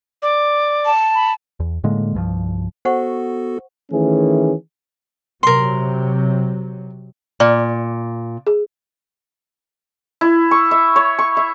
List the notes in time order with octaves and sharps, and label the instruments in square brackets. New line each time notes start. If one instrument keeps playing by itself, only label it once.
[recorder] D5 [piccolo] D6
[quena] A5
[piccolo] B5
[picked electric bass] E2
A2 D3 G#3 A#3
C2 G2 F3
[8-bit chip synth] B3 F#4 A4 [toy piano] C5 F#5 C#6
[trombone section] D#3 E3 A3 C#4 G#4
[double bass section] C3 F#3 [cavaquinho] A#4 C6
[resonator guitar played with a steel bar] A#2 [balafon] D5
[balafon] G#4
[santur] E4
C#6
E5
C#5
C#6
E5